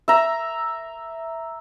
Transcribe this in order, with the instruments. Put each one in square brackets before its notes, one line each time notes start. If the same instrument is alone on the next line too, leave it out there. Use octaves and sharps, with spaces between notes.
[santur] E5 A#5